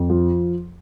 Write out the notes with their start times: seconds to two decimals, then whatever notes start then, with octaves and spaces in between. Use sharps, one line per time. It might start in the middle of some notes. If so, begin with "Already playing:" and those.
Already playing: F2
0.10 F3